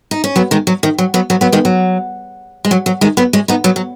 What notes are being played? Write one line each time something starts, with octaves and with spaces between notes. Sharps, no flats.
D#4
C#4
F#3 B3
D#3 G#3
F#3
D#3
F#3
F#3 B3
F#3 B3
F#3 B3
D#3 G#3
F#3
G#3
F#3
F#3
D#3 G#3
F#3 B3
G#3 C#4
B3 D#4
F#3 B3
F#3